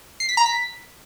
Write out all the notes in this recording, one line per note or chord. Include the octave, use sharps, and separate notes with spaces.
C7
B6
A#5
B6